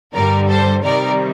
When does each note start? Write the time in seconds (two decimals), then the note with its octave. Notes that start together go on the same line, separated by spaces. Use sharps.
0.14 G2 D3 G3 A#4 D5
0.48 A4 C5
0.83 C3 D#3 G3 A#4 D5